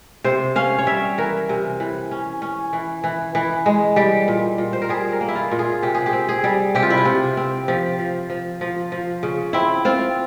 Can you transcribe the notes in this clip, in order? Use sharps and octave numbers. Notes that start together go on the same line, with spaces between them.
C3 C5
C#4 F5
C#5
G3 E5
E3 A#4
C3
E3
C#4
C#4
E3
E3
E3
G#3
G3 G4
A#2
A#2
C5
A#4
G3 G#4
A#4
A#3
E4
F4
A#2
G#4
C3 G4
G#4
G4
C4
G#4
G3
C3 G4
F4
E4
F4
C3
C4
F3 G4
F3
F3
F3
F3
C#3
C4 E4
C4 F4